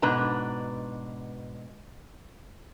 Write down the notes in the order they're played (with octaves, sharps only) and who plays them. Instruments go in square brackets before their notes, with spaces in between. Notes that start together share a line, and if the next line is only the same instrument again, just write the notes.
[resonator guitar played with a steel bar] G#2 B2 D4 B4 A#5